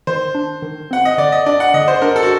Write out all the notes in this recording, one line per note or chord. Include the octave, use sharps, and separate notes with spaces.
D#3 C5
D4
D#3
C4 F#5
D#5
D3 D5
D#5
D4 D5
F#5
D3 D#5
C5
D4 A#4
A4
F#4